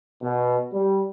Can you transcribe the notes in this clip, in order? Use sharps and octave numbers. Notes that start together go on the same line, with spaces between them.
B2
G3